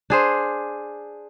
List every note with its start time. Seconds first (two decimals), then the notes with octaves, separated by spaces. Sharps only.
0.10 D4 G#4 C5